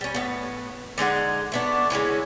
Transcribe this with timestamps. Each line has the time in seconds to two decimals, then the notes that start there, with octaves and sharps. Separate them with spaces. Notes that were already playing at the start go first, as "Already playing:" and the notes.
0.01 G3 C#4
0.14 A2 B3
0.98 D3 G#3 D#4 F#5
1.52 A3 B3 D4
1.90 C#3 G#3 C#4 E4